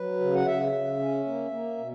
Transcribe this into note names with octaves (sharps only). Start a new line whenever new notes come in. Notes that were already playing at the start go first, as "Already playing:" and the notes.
Already playing: F#3 B4
C#3
F#5
C#3 E5
C#3
C#4
A#3
A#3
B2